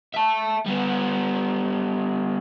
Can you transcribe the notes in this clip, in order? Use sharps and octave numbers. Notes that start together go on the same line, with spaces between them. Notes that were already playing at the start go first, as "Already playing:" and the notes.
E5 A5
G3 B3